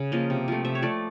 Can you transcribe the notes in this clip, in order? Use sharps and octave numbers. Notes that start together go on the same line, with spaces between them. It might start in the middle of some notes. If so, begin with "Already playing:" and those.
Already playing: C#3
F3 A#3 D#5
C3
F3 A3
C3 E5
C#5
F3 A3 D5